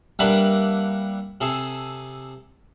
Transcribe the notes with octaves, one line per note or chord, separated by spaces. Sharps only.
G3 A#3 D4 B4 E5 F#5
C3 G#4 A4